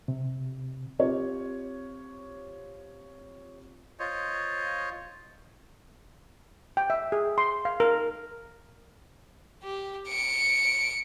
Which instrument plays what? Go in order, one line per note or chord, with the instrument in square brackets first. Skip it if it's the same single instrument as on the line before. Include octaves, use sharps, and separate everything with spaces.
[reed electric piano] C3
[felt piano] C4 F4 G4 C#5
[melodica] F4 C5 C#5 D#5
[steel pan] G5
E5
G#4
C6
F5
A#4
[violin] G4
C#7 D7